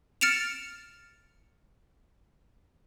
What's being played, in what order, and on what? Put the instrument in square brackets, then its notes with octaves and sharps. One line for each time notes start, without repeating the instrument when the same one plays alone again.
[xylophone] F6 A6 C#7 D7 E7 F7